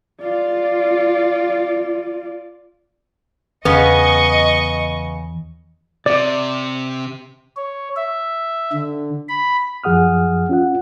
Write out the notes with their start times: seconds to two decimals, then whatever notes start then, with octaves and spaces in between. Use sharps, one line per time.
0.21 F4 D5
3.65 E2 C#3 B3 D#5 C#6
6.06 C3 D5
7.56 C#5
7.96 E5
8.73 D3
9.29 B5
9.84 F#2 F3 G#4 F#5 D#6 F6
10.49 C#4 F4 F#5